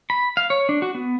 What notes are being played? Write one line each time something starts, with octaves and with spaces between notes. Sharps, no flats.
B5
F5
C#5
D4
F#4
B3